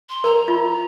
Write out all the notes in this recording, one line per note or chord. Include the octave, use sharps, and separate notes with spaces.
C6
A#4 A#5
F4